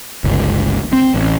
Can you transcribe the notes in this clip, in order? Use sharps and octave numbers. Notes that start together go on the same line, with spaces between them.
G1 C#2
C4
A1